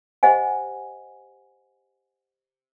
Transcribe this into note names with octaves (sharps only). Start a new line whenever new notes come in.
G4 C5 D#5 F#5 G#5